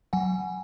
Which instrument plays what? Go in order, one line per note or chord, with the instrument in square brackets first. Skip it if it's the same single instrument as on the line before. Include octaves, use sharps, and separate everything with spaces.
[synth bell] F#3 F#5 G#5